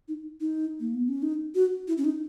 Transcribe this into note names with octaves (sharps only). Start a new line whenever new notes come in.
D#4
D#4
A#3
B3
C#4
D#4
F#4
E4
C#4
D#4